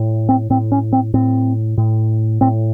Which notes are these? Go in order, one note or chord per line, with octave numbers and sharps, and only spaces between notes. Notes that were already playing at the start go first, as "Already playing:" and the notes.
Already playing: A2
C4
A2 C4
C#4
C4
A2 C4
A2
A2 C4